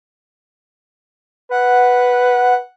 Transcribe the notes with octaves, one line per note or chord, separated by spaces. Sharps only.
B4 F#5